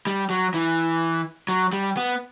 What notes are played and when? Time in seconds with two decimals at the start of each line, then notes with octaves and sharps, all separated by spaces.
0.07 G3
0.30 F#3
0.54 E3
1.49 F#3
1.73 G3
1.97 B3